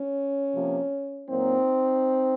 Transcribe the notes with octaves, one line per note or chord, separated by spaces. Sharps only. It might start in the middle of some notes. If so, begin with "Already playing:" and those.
Already playing: C#4
C3 F3 A#3
A#2 F#3 A#3 C4 D#4